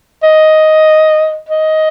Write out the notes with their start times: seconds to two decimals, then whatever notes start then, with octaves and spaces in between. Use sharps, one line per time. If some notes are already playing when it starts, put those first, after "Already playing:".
0.23 D#5
1.49 D#5